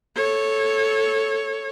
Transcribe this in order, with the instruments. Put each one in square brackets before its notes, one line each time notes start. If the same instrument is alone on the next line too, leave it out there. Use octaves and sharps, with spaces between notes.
[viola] A4 C#5